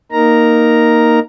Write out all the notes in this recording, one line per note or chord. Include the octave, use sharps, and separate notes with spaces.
A#3 D#4 A#4 A#5